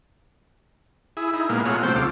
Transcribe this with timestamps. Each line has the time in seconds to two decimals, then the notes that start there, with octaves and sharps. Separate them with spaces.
1.17 E4 G#4
1.34 D#4 E4
1.49 A#2 G#3 A#3 B3
1.66 A3 A#3 F4 G#4 C#5 F#5
1.83 C3 F#3 A3 C4 C5 G5
1.95 D2 F4 A4 D6